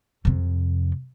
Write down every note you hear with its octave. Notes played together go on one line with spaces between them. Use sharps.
F2 C3